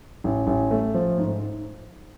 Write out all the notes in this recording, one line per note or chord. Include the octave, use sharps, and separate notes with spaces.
A1
A1
A3
F3
G#2